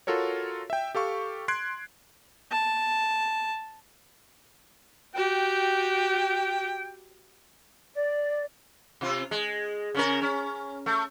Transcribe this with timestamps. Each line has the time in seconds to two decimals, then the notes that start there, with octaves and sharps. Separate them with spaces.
0.07 F4 F#4 A4 A#4 C#5
0.70 E5 G5
0.95 G4 A4 F5 C#6
1.48 C6 F#6 G#6 C7 D7
2.51 A5
5.15 F#4 G4 G5
7.94 D5
9.01 C3 F4
9.31 G#3
9.95 C#3 C#4 A#4
10.22 C#4
10.86 A3